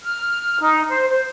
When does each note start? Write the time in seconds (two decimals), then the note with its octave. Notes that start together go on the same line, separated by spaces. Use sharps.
0.02 F6
0.60 D#4
0.89 C5
1.09 C5